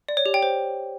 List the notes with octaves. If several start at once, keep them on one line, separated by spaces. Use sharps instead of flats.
D5
C#5
G4
G5
C5